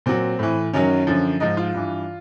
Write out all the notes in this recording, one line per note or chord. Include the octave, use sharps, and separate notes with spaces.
A#2 F#3 C4
A2 E3
F#2 D#3 F#3 C#4
F#2 D3 F3
G#2 F3 D#4
F4
G2 E3